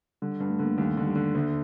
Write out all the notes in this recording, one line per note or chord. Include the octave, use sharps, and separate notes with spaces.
D3 G3
G2
A3
D3 A#3
A3
D#2 G3
D3
G3
D3
D2 A#3